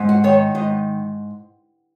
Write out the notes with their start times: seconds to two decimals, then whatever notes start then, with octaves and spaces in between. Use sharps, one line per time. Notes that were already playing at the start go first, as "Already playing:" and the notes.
Already playing: G#2
0.09 F#4
0.24 D#3 C#5
0.55 G#2 D#5